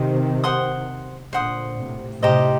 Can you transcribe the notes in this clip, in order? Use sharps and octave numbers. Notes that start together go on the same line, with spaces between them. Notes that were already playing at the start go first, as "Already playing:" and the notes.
Already playing: C3 D#3 C5 D#5 G5
C5 F#5 C6 D#6
A#2 D3 C5 F#5 C6 D#6
A2 C3
A2 C3 D#4 G4 C5 D#5